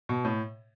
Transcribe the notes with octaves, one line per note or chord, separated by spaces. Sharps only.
B2
A2